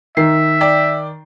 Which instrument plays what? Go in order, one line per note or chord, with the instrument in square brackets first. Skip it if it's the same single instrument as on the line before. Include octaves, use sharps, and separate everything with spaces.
[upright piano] D#3 [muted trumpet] E5 [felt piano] C7
[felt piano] D5 G5